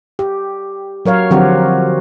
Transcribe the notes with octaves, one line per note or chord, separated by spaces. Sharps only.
G4
F#3 A#4 C#5 F5
D3 F3 F#3 C4 F#4 G4